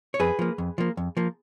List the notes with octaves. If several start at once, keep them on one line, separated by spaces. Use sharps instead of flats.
C#5
F2 G#4 B4
F3 A#3
F2
F3 A#3
F2
F3 A#3